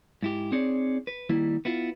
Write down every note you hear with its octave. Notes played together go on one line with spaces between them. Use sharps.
G#2 E4 G4
C4 D#4 G#4 C#5 D5
B4
D#3 G3 A#3 E4
B3 E4 F4